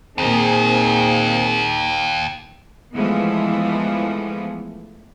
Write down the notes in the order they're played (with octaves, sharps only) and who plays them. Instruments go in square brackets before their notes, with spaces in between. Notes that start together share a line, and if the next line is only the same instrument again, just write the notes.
[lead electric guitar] D#2 [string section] A#2 D#3 [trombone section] C4 G#4
[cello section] E3 F3 G#3 A3 B3